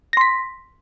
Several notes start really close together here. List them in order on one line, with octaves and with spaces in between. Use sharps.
A#6 C6 B6